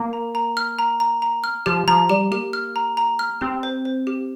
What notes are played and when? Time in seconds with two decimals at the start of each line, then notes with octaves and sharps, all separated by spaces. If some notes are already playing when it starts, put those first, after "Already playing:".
Already playing: A#3
0.13 A#5
0.35 A#5
0.57 F6
0.79 A#5
1.00 A#5
1.22 A#5
1.44 F6
1.66 F3 G4
1.88 F3 A#5
2.09 G3 G4
2.31 A#3 G4
2.53 F6
2.76 A#5
2.97 A#5
3.19 F6
3.41 C4 G4
3.63 C5
3.85 C5
4.07 G4